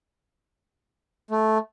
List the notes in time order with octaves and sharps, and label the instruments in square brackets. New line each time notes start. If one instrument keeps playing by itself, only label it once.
[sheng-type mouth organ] A3